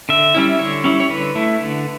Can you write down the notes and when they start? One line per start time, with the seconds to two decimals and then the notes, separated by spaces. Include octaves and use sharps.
0.09 D3 E5
0.35 G3 C#4 E4
0.59 D3 C#5
0.84 G3 C#4 E4
1.00 C#5
1.09 D3 B4
1.35 A3 E4
1.60 D3